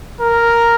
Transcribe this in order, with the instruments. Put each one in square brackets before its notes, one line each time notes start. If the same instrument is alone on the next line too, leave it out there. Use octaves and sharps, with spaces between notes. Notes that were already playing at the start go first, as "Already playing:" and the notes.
[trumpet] A#4